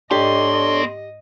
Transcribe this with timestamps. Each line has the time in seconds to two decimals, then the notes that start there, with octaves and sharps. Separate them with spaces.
0.11 G#2 B3 D4 G4 A4 C#5 D#5 C6
0.52 D#5